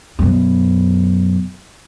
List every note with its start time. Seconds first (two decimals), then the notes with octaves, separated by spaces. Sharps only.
0.19 F#2 B2